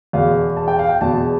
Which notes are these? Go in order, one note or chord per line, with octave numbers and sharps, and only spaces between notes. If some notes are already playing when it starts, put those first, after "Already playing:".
E1 E2 B2 F5
A5
G5
F5
G5
E1 E2 B2 A5